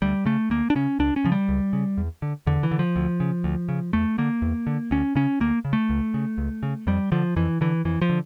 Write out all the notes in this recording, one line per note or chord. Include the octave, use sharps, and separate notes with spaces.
D2 G3
C#3 A3
D2 A#3
D4
C#3 C#4
C#2 D4
C#4
C#3 F3
G3
C#2
C#3
E2
D3
E2 D3
E3
D3
F3
D2
C#3
D2
C#3
E2 A3
D3 A#3
E2
D3
D2 C#4
C#3 C#4
D2 A#3
C#3
A3
C#2
C#3
C#2
C#3
F2 G3
D3 F3
F2 E3
D3 E3
F2 E3
F3
D3